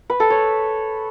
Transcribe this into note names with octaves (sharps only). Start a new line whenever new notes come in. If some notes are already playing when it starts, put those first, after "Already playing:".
B4
A4
C#5